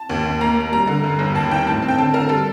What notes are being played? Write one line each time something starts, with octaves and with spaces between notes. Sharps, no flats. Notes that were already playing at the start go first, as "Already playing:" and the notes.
Already playing: A5
D#2
D#2
A#3 A#5
A#3
G3 A#5
D3
G2
G1
D#2 A5
D#3 G5
A2 A5
C4
G5
D3 A5
D3 A#4
G3 A4